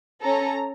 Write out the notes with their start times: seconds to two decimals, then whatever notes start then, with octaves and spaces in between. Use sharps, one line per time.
0.22 C#4 A4 A#5